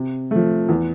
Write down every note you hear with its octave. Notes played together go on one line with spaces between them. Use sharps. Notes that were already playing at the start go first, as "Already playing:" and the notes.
Already playing: C3
F3 A3
E2